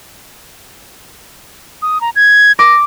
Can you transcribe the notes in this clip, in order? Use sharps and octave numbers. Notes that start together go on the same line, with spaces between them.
D#6
A#5
G#6
D6 A#6